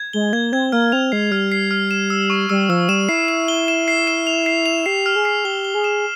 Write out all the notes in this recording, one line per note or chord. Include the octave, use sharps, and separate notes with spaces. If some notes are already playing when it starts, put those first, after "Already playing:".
Already playing: G#6
G#3 G7
A#3 G#6
C4 G#6
A#3 F6
C4 F7
G#3 C7
G3 F6
C7
F6
E7
E6
C#6
G3 E6
F3 E6
G3 E7
E4 C7
E7
G7
E7
C7
E7
F7
C7
F7
G4 C7
F6
G#4
C7
G4 G7
G7
G#4
E7